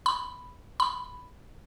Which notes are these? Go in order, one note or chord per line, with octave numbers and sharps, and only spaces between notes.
B5
B5